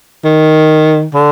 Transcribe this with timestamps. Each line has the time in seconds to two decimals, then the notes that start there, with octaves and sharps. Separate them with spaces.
0.24 D#3
1.14 D3